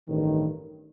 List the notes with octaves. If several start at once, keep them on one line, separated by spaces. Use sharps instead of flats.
A1 G2 D#3